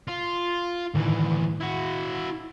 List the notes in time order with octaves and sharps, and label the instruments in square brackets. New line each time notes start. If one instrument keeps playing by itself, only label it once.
[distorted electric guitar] F4
[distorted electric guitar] D2 E3 [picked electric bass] A2 D#3
[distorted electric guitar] E4 F#4